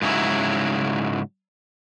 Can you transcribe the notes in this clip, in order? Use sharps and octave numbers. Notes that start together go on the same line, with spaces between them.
G#2 C#3 F#3 E4